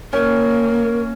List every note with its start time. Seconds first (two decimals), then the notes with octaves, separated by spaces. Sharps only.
0.13 A#3 C#4 A#4